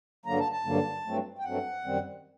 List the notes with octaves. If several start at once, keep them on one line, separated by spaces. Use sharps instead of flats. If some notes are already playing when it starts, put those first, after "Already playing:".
G2 D3 F#3 A#3 A#5
A5
A5
G2 D3 F#3 A#3
G2 F#3 A3 C4
G5
G2 F#3 A3 C4 F#5
F#2 D#3 G3 C4